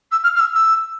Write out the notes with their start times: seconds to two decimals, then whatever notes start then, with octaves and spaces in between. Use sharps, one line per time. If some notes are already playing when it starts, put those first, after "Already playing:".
0.11 E6
0.23 F6
0.35 F6
0.39 E6
0.55 E6